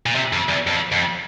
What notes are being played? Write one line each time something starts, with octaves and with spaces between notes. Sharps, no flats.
A#2
C3
F2
E2
F2
F2